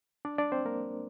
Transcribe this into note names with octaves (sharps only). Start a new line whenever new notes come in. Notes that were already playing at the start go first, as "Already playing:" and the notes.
D4 D5
D4 D5
C4 C5
A#3 A#4